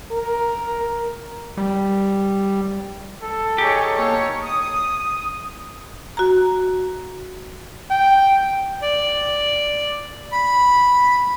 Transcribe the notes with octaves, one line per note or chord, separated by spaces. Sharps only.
A#4
G3
A4
D#4 G4 G#4 C#5
A#3 C#5
D#6
F#4 A#5
G5
D5
B5